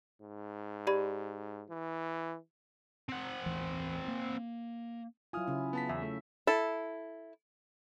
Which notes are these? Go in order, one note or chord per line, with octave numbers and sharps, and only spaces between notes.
G#2
G4 D5 B5
E3
C4 F#5
A1 D#2 E3
A#3
F#3 E4 F4 G#5 D#6 F6
C#3 C#4 E4
B3 A5 B6
E2 E5
A3
E4 A4